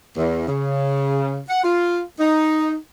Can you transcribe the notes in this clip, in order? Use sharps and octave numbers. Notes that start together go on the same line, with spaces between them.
E2
C#3
F#5
F4
D#4